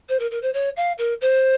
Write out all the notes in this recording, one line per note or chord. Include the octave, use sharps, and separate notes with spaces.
C5
A#4
A#4
C5
C#5
F5
A#4
C5